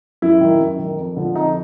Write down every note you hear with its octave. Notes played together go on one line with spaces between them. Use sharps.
F#2 E4
D#3
F#2
D#3
F2
D3 F3
F2 D#4